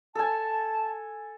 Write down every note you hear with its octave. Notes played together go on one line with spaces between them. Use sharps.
A4 G#5 A5